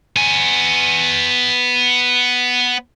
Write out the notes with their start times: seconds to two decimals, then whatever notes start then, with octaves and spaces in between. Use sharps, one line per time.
0.16 B3 G#5